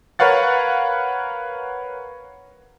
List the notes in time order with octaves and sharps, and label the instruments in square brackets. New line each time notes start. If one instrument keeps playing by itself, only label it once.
[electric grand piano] A#4 B4 C#5 F5 F#5 A6